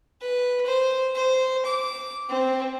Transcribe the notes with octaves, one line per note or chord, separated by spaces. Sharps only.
B4
C5
C5
D6
C4